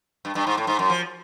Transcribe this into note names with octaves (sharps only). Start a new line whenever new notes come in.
G2
G2
G#2
A2
G#2
F#2
F3